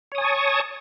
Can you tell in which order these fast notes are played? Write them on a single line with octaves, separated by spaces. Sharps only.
C#5 D#6 G#5 A5 C#6